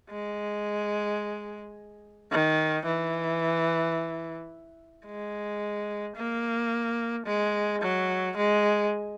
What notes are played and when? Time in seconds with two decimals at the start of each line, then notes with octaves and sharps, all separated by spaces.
0.10 G#3
2.31 D#3
2.86 E3
5.06 G#3
6.16 A#3
7.26 G#3
7.82 F#3
8.37 G#3